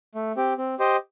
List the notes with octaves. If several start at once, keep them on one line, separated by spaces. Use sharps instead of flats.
A3
C4 G4
C4
G4 C5 D#5